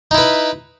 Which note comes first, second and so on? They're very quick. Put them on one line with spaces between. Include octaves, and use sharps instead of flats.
D#4 E4 B4